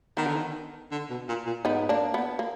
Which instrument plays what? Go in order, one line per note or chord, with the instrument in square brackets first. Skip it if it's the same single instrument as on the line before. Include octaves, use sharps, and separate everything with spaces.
[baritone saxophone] D#3 [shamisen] B3
[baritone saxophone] D3
D#3
D3
B2
A#2
A#2
[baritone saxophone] G#2 [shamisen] B3 D#4
[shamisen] A#3 D4
B3
A#3